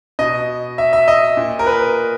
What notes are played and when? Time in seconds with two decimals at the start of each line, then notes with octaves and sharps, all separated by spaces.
0.19 B2 D#5
0.78 E5
0.93 E5
1.08 D#5
1.37 A#2
1.59 A#4
1.67 B4